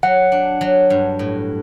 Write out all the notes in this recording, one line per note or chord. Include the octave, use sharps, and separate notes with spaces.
F#3 F#5
D4
F#3
G2
A2